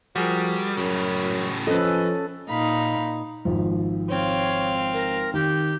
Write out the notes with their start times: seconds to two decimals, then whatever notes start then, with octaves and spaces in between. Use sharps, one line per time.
0.16 F3 G3 F#4 G#4 A#4
0.77 F#2 A2 C#3
1.67 F3 C#4 A4 B4 D#5
2.49 A#2 D#4 F5 B5
3.45 G#1 F3
4.09 C4 C#5 F5
4.93 A#4
5.34 D#3 G4